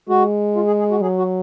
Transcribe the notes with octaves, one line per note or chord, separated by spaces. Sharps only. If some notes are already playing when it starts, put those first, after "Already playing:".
G#3 F#4
F4
G#4
G#4
F#4
F#3 G#4
F#4